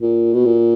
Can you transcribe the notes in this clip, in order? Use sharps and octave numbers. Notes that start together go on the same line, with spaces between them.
A#2
B2
A#2